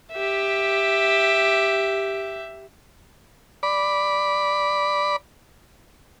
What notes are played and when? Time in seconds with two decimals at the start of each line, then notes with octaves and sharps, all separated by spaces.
0.12 G4 E5
3.63 D5 B5